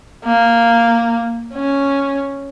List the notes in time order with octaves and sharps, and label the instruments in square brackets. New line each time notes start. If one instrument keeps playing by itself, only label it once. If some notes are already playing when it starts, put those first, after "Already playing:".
[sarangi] A#3
C#4